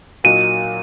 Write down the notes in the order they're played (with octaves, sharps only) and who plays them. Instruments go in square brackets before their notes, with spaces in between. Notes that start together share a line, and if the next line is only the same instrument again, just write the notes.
[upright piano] A#2 F#3 A#3 D#4 F#4 [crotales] D#7